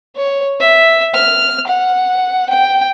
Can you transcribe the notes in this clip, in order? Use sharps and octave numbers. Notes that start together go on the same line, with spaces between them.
C#5
E5
F6
F#5
G5